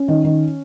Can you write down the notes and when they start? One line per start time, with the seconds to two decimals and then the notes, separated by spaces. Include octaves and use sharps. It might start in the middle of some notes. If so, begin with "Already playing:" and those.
Already playing: C#4
0.08 D#3
0.24 D#3